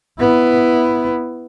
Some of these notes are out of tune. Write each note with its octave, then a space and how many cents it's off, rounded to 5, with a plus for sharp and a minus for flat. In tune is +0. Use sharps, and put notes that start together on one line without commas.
B3 +5 E4 +0